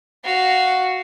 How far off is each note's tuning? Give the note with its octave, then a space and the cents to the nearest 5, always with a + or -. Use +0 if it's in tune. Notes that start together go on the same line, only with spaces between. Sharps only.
F#4 +0 F5 -5